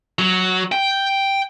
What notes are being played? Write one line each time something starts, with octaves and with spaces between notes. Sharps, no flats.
F#3
G5